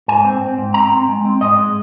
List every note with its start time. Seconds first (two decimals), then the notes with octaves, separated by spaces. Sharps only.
0.08 G#2 G#5
0.25 C4
0.41 C4
0.58 G#2
0.74 C4 A#5
0.92 C4
1.09 G#3
1.25 C4
1.41 G#2 D#5
1.59 G#3